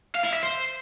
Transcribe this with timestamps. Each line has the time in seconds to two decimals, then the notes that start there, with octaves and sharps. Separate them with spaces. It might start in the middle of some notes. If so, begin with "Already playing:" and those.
0.15 F5
0.24 E4
0.34 E5
0.43 C5